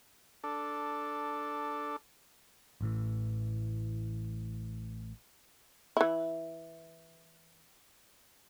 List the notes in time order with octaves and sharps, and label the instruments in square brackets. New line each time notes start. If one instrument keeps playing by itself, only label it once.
[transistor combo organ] D4 A4
[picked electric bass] A1 A2 E3
[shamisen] E3 E4